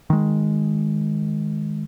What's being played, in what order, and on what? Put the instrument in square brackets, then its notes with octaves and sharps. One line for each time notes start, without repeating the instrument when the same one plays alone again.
[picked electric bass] D#3 G#3